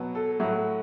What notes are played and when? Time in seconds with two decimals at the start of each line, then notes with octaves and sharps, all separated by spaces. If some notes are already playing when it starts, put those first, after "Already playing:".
Already playing: B2 F#3 B3
0.15 A4
0.39 A2 F#3 A3 F#4